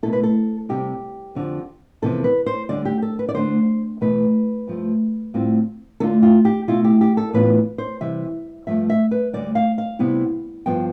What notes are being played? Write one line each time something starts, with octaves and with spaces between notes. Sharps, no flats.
B2 A3 E4 A4
B4
A4
C3 G3 C4 G4
F2 D3 F3
F2 C3 E3 B3 A4
B4
C5
D2 D3 G3 D5
G4
A4
B4
D5
D2 D3 A3 D4 C5
E2 B2 A3 E4 B4
G2 F3 A3
A2 G3 C4 F4
D3 A3 D4 F4 A4
F4
G4
B2 A3 E4 F4
G4
G4
A4
A2 E3 B3 D4 F4 B4
C5
C3 E3 G3 E5
G2 F3 A3 E5
E5
B4
D2 D3 G3 D5
F5
F5
C3 G3 B3 E4
G2 F3 B3 G5